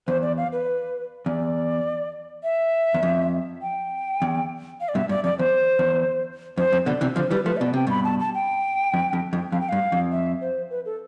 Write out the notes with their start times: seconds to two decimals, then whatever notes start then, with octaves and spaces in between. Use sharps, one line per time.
0.07 E2 C5
0.22 D5
0.37 F5
0.52 B4
1.26 E2 D5
2.43 E5
2.94 E2
3.03 F2
3.62 G5
4.22 E2
4.81 F5
4.89 D5
4.95 G2 B2 E5
5.09 G2 D5
5.24 F2 D5
5.39 E2 C5
5.79 E2
6.57 F2 C5
6.72 F2
6.86 B2 D3 D5
7.01 C3 E3
7.16 D3 F3 C5
7.30 E3 G3 B4
7.45 F3 A3 B4
7.57 E5
7.60 B2 D5
7.74 C3 G5
7.87 G2 B2 B5
8.04 A5
8.20 A5
8.35 G5
8.94 F2
9.13 F2
9.33 F2
9.52 F2 F5
9.61 G5
9.69 G2 F5
9.92 F2
10.11 E5
10.41 C5
10.70 B4
10.85 A4